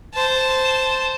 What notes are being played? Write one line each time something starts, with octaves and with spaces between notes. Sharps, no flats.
C5 A5